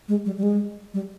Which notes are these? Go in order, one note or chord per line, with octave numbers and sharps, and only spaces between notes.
G#3
G3
G3
G#3
G3